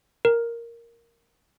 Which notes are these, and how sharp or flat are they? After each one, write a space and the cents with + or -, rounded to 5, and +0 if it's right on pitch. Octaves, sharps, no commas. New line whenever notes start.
A#4 +0